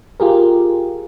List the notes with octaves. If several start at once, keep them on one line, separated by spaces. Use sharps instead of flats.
F4 G4 G#4 A#4